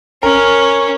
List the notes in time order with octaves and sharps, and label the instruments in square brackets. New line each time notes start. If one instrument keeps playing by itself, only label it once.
[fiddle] C#4 [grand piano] A#4